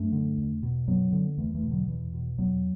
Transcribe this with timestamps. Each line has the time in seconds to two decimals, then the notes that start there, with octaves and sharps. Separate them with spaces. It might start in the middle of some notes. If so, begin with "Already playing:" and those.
Already playing: F#2 A3 D4
0.12 D3
0.38 E2
0.63 B2
0.88 F#2 F#3 B3
1.12 D3
1.38 E2 E3 A3
1.55 E3 A3
1.63 B2
1.71 D3 F#3
1.88 E2 E3
2.14 B2
2.38 E2 F#3 B3